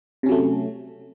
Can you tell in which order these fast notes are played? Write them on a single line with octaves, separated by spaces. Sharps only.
C3 C#4 F#3 A3